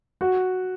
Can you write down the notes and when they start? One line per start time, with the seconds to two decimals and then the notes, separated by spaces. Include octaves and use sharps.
0.21 F#4